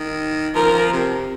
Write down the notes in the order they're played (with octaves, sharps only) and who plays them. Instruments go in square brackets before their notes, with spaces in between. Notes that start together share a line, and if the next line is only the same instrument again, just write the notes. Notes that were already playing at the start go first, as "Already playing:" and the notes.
Already playing: [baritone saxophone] D#3
[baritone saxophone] F3 [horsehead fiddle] A#4
[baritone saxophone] C3